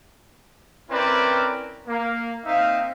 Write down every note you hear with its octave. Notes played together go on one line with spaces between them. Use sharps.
C4 C#4 E4 A#4 B4 D5
A#3
A#3 C4 D#4 E5 F5